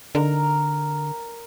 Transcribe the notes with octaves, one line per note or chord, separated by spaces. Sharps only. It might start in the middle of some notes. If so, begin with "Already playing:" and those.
D3 A#4 A#5